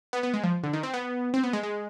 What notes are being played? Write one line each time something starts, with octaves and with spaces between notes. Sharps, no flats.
B3
B3
G#3
F3
D3
D#3
C4
B3
C4
B3
G#3
G#3